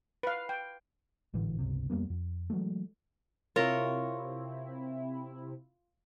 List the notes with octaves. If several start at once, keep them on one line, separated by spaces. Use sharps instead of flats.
B4 F5
G5
G#1 A2 D3 E3
G1 C#2 C3
F2 G3 A#3 B3
F2
E3 F#3 G#3 A3
C3 C4 E4 F4 A#4 C#5 E5